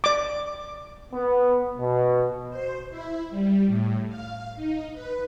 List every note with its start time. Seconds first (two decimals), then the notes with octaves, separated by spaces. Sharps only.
0.04 D5 D6
1.14 B3
1.79 B2
2.49 C5
2.90 E4
3.30 G3
3.67 A2
4.09 F5
4.56 D#4
4.93 B4